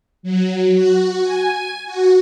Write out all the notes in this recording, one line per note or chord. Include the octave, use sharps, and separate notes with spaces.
F#3
F#4
G#5
F#4